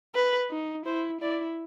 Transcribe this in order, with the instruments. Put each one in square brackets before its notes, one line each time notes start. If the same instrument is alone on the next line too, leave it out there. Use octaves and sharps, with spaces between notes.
[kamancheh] B4
[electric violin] D#4
[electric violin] E4 [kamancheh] C5
[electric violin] E4 [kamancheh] D5